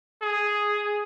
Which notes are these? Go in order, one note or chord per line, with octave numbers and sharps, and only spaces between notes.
G#4